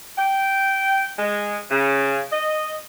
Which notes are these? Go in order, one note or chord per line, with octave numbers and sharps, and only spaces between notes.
G5
G#3
C#3
D#5